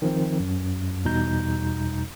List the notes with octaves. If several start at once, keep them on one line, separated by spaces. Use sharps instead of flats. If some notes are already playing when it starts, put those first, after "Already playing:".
D#3 F3 C4
F#2
E2 B2 G3 D#4 A#5 G6